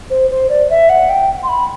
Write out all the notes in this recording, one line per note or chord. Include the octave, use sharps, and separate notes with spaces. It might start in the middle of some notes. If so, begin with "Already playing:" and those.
C5
C5
D5
E5
F#5
G5
C6
B5